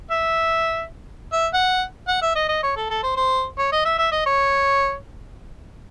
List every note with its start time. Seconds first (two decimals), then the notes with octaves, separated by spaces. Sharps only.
0.11 E5
1.33 E5
1.54 F#5
2.08 F#5
2.22 E5
2.36 D#5
2.49 D#5
2.63 C#5
2.76 A4
2.90 A4
3.03 C5
3.17 C5
3.58 C#5
3.72 D#5
3.85 E5
3.98 E5
4.12 D#5
4.26 C#5